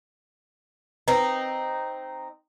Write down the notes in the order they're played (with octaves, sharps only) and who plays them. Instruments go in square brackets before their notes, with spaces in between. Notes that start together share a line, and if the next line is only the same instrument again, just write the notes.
[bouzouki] C4 D#4 [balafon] B4 A#5